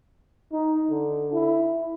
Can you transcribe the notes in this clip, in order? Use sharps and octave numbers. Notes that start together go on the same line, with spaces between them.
D#4
D3
E4